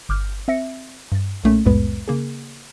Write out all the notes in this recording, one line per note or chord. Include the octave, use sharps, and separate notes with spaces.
G1 D6 F6 G6
C4 E5 A#6 C#7
G2 A6
B1 A#2 A3 A#3 C#4
C2 F2 A2 G#3 B3 B4
C#3 A#3 G#4